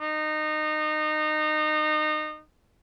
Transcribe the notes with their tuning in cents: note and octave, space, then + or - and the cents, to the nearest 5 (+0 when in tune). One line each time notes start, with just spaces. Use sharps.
D#4 -25